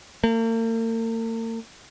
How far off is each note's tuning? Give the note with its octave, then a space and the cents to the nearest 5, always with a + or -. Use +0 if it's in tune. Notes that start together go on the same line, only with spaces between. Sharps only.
A#3 -45